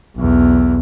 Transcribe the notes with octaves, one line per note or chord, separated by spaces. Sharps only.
B1 E2